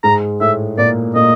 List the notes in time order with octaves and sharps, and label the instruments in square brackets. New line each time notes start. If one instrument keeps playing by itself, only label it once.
[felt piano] G#2 G#3 [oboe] A#5
[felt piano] A2 A3 [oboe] E5
[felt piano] A#2 A#3 [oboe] D5
[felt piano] A#2 A#3 [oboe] D#5